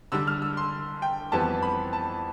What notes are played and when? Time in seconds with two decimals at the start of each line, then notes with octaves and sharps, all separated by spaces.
0.12 D3 G3 D4 E6
0.27 F6
0.42 E6
0.57 C6
1.02 G5
1.32 F2 E3 G3 B3 A5
1.62 B5
1.93 A5